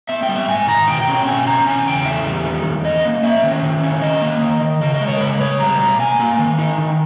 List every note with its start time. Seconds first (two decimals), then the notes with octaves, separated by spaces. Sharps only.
0.09 B3 E5
0.23 G5
0.29 G3
0.36 E5
0.48 G#2 G#5
0.68 D#3 A#5
0.88 B2 G5
1.01 G5
1.08 C#4
1.15 G5
1.27 B2 G#5
1.46 C#4 A#5
1.66 E2 G#5
1.87 C#3 G5
2.06 E2 E5
2.26 G3
2.45 D#3
2.65 E2
2.84 C#4 D#5
3.05 A#3
3.23 C#4 E5
3.43 D#3
3.63 D#3
3.83 C#4
4.02 D#3 D#5
4.22 A#3
4.42 D#3
4.62 D#3
4.81 C#3 D#5
4.95 D#5
5.01 G#3
5.07 C#5
5.17 A#4
5.21 C#3 B4
5.41 C#3 C#5
5.60 G3 A#5
5.79 B2 A#5
5.99 A#3 G#5
6.20 A#3
6.39 D#3
6.58 D#4
6.78 D#3